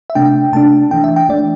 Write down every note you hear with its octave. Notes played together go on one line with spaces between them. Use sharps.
E5
C3 A3 D4 G5
C3 A3 D4 A5
E3 A3 D4 G5
E5
G5
E3 A3 D4 D5